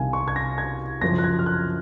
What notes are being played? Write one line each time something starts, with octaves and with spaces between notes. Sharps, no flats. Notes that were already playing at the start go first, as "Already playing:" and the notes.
Already playing: C2 C3 D#3 F5 G#5
C#6
G#6
A#6
G#6
F#2 C#3 F3 A#6
F#6
G#6
F6
F#6